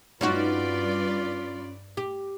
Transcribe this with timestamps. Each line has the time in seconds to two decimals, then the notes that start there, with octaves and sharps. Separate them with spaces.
0.21 G2 C#4 D#4 F4 F#4 B4 D5
1.97 G4